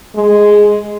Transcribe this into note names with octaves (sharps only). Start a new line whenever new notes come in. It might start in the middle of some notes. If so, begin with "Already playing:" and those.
G#3